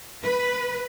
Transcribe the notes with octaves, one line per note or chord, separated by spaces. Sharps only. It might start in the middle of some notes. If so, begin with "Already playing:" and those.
B4